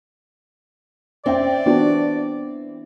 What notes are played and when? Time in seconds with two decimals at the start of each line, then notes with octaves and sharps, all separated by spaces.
1.26 C4 C#4 D5 E5 G5
1.66 E3 B3 D4 F#4